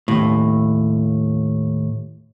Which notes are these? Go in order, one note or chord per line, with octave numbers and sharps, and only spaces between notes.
D#2 A2